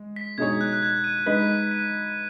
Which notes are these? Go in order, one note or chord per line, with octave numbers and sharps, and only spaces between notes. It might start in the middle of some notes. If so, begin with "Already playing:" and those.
Already playing: G#3
B6
B2 G#3 D#4 G#4 C#5 G#6
F#6
F#6
G#6
D#7
G#3 D#4 B4 D#5 B6
D#7